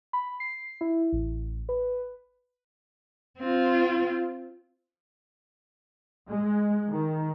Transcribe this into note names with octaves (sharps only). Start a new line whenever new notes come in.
B5
C7
E4
A1
B4
C4 F4
G#3
D#3